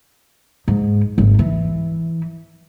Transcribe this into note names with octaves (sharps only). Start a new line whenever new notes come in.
G#2
G#1
E3